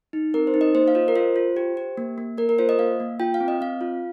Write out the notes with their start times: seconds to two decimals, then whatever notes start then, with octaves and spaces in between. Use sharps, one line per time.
0.13 D#4
0.34 C4 A#4
0.47 C5
0.54 D#4
0.61 D#5
0.74 A#3 C5
0.88 F5
0.95 F4 D#5
1.08 A#4
1.16 F4 C5
1.36 F4
1.56 G4
1.77 G4
1.98 A#3
2.18 A#3
2.38 A#3 A#4
2.49 A#4
2.58 F4 C5
2.69 D#5
2.79 A#3 F5
3.00 A#3
3.20 F4 G5
3.34 F5
3.40 C4
3.48 D#5
3.61 C4 F5
3.81 F4